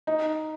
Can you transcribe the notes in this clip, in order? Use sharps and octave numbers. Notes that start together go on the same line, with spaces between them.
D#4